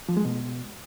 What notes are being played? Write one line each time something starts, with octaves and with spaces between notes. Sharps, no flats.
F3
G#3
B2